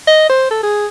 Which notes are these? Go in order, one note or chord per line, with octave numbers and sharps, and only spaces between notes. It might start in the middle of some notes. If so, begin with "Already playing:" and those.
D#5
C5
A4
G#4